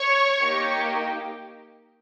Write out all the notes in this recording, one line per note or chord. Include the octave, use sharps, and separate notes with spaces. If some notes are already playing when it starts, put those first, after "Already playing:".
Already playing: C#5 C#6
A#3 D#4 G4